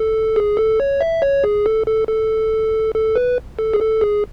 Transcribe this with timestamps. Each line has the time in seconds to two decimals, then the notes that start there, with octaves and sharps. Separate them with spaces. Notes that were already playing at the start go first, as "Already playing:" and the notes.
Already playing: A4
0.36 G#4
0.57 A4
0.80 C#5
1.01 E5
1.22 C#5
1.44 G#4
1.66 A4
1.87 A4
2.08 A4
2.95 A4
3.16 B4
3.59 A4
3.73 G#4
3.80 A4
4.01 G#4